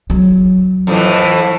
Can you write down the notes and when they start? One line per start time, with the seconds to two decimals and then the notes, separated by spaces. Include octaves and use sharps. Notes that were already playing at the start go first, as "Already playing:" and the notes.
0.10 F#3
0.87 F2 A2 E3